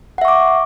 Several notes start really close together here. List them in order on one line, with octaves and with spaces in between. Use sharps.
F#5 E5 C#6 D6